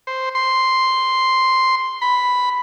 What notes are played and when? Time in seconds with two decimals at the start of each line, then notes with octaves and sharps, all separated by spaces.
0.07 C5
0.35 C6
2.02 B5